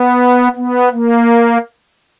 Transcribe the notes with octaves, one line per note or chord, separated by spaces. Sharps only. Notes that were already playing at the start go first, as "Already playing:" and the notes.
Already playing: B3
B3
A#3